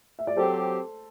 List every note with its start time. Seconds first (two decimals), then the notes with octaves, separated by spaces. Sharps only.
0.19 E5
0.27 D5
0.37 F#3 C4 G4 A4 C5